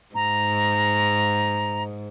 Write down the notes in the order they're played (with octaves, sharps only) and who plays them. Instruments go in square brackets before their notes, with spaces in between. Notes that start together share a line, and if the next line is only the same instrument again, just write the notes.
[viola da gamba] G#2 [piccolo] A#5